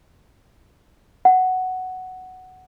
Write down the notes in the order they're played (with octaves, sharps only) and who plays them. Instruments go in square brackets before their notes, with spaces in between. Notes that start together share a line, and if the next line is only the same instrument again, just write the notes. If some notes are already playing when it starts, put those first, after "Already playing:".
[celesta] F#5